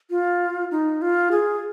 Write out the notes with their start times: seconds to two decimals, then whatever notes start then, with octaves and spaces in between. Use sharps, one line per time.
0.10 F4
0.71 D#4
1.02 F4
1.31 G#4